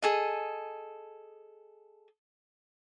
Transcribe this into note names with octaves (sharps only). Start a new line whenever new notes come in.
G#4 A4 D#5